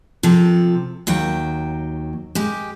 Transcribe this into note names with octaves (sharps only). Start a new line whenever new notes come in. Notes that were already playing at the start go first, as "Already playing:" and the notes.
C3 F3 A4
D#2 F#3 G5
G#3 G4